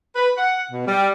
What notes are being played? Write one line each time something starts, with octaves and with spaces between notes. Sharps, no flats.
B4
F#5
B2
G3